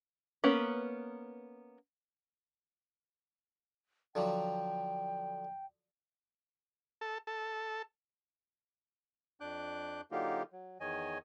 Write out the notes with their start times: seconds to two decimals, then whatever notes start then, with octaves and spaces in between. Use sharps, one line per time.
0.44 A#3 B3 C#4 B4
4.15 D3 F3 F#3 G5
7.01 A4
7.27 A4
9.40 F2 D4 D6 F#6 G6
10.11 D3 F#3 A#3 D#4 F4 G4
10.52 F#3
10.80 E2 D#3 C#5 D#5 G#5